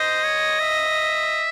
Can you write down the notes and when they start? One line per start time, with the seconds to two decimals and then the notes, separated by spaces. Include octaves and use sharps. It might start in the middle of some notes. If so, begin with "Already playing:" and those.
Already playing: C5 D#5
0.24 C#5
0.60 E5